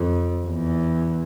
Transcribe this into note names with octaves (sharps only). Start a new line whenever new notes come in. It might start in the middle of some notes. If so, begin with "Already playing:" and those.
Already playing: F2
E2